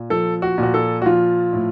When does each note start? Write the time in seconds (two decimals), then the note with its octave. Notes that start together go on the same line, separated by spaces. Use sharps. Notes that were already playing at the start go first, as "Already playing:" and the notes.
Already playing: A#2
0.10 F3 A4
0.42 F#4
0.58 A#2 F#4
0.74 A4
1.02 F#4
1.06 F3 F4
1.53 A2